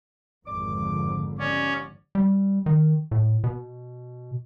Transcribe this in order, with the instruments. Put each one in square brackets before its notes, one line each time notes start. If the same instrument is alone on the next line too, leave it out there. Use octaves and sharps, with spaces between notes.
[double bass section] G#1 F2 D3 [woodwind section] D6
[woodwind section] D#2 B3 D5 [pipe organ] C#4
[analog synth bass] G3
D#3
A2
B2